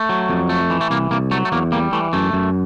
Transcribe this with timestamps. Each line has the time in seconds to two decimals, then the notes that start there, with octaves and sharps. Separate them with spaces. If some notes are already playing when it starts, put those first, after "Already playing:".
Already playing: A3
0.09 F#3
0.29 F2
0.49 A3
0.70 E3
0.81 A3
0.90 C2 A#3
1.11 C2 A#3
1.31 F#3 A3
1.45 A3
1.52 E2 A#3
1.72 G3 A#3
1.92 E3 A3
2.13 F#2 A3
2.33 F#2